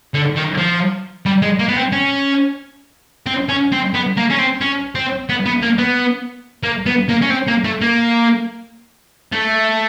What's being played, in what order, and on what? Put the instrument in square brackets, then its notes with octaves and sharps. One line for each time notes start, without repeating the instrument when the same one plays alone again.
[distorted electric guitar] D3
D#3
F3
G3
G#3
A#3
B3
C4
C#4
C4
C#4
C4
B3
A#3
C#4
C4
C#4
C4
B3
B3
A#3
B3
A#3
B3
A#3
C#4
C4
A#3
A3
A#3
A3